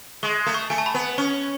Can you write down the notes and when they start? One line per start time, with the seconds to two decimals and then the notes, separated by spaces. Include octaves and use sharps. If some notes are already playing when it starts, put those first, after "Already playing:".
0.23 G#3 C#6
0.46 A3
0.54 C#6
0.70 A3 G#5
0.78 A5
0.86 B5
0.94 B3
1.18 C#4 C#6